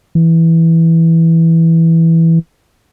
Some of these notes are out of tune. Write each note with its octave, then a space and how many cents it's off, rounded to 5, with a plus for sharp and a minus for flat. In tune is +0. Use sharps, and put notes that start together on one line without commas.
E3 -5